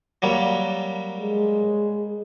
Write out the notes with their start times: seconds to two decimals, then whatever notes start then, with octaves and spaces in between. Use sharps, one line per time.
0.22 F#3 G3 A#3
1.19 G#3